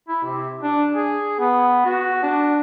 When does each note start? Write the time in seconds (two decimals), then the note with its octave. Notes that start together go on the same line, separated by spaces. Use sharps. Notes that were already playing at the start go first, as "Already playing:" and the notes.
0.08 E4
0.24 C3
0.63 D4
0.94 G#4
1.40 B3
1.85 F#4
2.23 D4